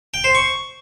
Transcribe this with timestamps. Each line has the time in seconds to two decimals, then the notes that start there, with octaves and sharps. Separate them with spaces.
0.14 G5
0.24 C5
0.35 C#6